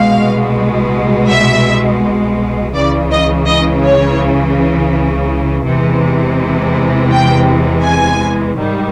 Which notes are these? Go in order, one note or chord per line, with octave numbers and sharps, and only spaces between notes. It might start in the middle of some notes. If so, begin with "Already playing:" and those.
Already playing: C2 B2 G#3 F5
E5
C#2 C#3 E3 D5
D#5
D#5
C#5
E2 C3 E3 G#3
G5
G#5
G#2 D#3 G3